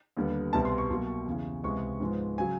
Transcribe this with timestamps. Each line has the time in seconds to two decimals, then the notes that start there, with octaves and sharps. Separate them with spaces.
0.17 D#2 D3 G3 B3
0.52 C2 B2 G3 B3 A5
0.65 C6
0.78 C#6
0.90 B2 F#3 A#3
1.26 E2 C#3 E3
1.64 C#2 C3 E3 G#3 B3 C#6
2.00 G#2 F3 G#3 B3
2.38 C#3 F#3 G#5